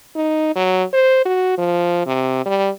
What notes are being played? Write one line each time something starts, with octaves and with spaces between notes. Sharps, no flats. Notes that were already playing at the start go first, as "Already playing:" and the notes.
D#4
F#3
C5
F#4
F3
C3
G3